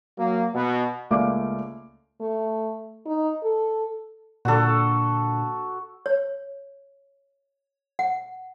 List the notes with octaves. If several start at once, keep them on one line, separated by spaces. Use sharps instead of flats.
F#3 A#3
B2
C#2 A3 A#3 D5 D6
A3
D#4
A4
A#2 D3 F#4 A4
C#5
F#5